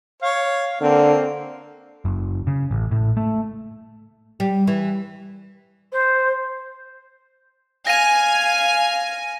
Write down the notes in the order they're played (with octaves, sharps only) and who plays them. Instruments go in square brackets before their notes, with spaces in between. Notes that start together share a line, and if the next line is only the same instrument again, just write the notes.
[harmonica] C#5 [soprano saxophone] F5
[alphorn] D3 [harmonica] A#3 [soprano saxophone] C4
[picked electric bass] F#1
C#3
A1
A2
A3
[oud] G3
E3
[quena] C5
[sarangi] F5 [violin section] G#5 [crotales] A#6 D#7